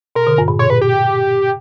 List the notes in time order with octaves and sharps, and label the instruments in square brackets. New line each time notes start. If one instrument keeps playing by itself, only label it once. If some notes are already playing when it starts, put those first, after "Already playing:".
[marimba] B2 [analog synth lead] A#4
[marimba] B2 D3
G2
A#2
[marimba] B2 [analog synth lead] C#5
[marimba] A#2 [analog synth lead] B4
[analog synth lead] G4